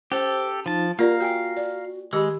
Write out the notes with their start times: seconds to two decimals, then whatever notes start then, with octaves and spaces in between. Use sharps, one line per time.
0.12 C#4 G4 A4 C5
0.66 F3 D#4 A5
0.99 A#3 F4 G4 A#4 D5 F5 A#5
1.20 F#4 A#4 G5 G#5
1.57 D5
2.13 D#3 G#3 G4 D#5 B5 E6